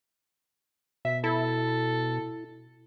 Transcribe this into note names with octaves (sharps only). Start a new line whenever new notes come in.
B2 E5
E4 A4